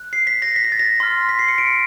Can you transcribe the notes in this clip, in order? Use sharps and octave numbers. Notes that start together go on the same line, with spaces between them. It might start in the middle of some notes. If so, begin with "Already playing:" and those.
Already playing: F#6
C7
B6
A#6
B6
A#6
A6
A#6
C6 F6
B6
C7
C#7
D7